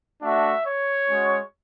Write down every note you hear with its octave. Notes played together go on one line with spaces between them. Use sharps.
A3 D4 F#4 E5
C#5
G#3 C#4 F#4